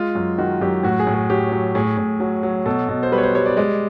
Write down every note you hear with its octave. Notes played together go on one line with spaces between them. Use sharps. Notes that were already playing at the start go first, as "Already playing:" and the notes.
Already playing: G#3 F4
F#2
D#3 F#4
F#2 G4
A2 F#4
G#4
A2
G#4
F#3 G4
F#3
A2 G#4
A2
F#3
F#3
B2 A4
B2
C5
G3 B4
C#5
C5
G3 C#5
D5
G#3 D5